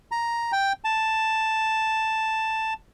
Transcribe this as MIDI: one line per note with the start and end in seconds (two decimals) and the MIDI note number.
0.11 0.52 82
0.52 0.73 79
0.84 2.74 81